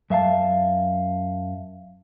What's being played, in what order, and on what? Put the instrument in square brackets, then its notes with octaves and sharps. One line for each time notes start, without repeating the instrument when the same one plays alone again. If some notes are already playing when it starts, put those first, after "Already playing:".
[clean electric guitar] F#2 E5 F5 A5